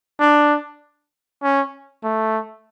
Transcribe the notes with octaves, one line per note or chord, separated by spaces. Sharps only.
D4
C#4
A3